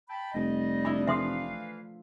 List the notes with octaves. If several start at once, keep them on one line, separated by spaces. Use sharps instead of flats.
G5 A5 B5
F1 G3 D#5
D4 E4 B5
E3 F3 A3 B4 E5 F5 C6 D#6